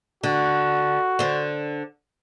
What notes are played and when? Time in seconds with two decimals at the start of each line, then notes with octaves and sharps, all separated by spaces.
0.23 D3 F#4
1.19 D3 C5